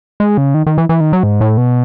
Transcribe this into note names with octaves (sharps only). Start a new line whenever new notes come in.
G#3
C#3
D#3
D#3
E3
E3
D#3
F#3
G#2
A2
B2